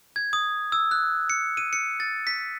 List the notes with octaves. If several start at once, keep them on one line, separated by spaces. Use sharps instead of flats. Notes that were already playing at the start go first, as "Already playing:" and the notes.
G#6
D#6
E6
F#6
C#7
D#7
C#7
A6
B6